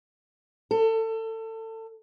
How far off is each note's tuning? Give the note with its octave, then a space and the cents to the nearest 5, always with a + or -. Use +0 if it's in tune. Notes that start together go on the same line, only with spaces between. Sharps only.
A4 +25